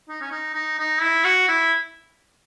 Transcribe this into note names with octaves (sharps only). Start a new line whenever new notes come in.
D#4
C#4
D#4
D#4
D#4
E4
F#4
E4